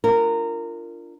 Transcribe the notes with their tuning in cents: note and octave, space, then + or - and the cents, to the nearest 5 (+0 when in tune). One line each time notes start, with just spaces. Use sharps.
D4 +10 F4 -20 A#4 -20